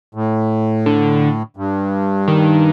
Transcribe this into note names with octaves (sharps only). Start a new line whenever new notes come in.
A2
D3
G2
D#3